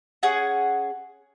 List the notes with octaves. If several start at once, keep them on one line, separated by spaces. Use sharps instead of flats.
C#4 G#4 F#5